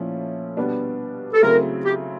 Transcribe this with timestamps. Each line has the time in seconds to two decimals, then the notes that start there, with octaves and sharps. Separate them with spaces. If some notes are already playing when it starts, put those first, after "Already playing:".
Already playing: A#2 F3 A3 C#4 E4
0.57 B2 G3 B3 D4
1.33 A4
1.42 C#3 F#3 A3 C4 E4 A#4
1.85 G4